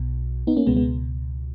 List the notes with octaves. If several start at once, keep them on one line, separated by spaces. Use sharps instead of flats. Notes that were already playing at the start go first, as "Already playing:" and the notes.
Already playing: B1 B2
B3 D#4
A#3 C#4
C#2 B2 G#3 B3
G#3 B3